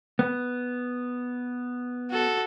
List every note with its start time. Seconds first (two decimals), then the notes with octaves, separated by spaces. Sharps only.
0.19 B3
2.11 F#4 A4